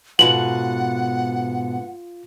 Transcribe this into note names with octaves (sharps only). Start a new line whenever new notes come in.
G#2 B2 D3 F4 F#5 F#7